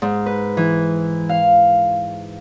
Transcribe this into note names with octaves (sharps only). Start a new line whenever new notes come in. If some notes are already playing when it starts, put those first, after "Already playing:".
G#2
B4
E3
F5